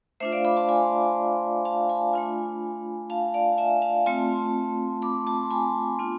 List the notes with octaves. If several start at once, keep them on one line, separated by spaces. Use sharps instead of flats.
A3 D4 F4 C5 E5
D5 F5
B5 D6
A5 C6
G#5 B5
F5 A5
G#5 B5
A3 D4 F4
F5 A5
D5 F5
E5 G#5
F5 A5
A3 C4 F4 A5 C6
B5 D6
A5 C6
G#5 B5
B3 D4 F4